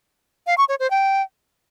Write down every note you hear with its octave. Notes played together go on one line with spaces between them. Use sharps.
F5
C#6
C#5
C5
G5